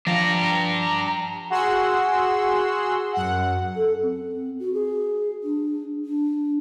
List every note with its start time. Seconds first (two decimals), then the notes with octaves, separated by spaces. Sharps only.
0.07 F3 D4 G4 F5 A#5
1.50 F#4 G#4 F#5 C6 E6
3.13 F#2 F#5
3.76 A4
4.02 C4
4.59 F#4
4.73 G#4
5.43 D4
6.05 D4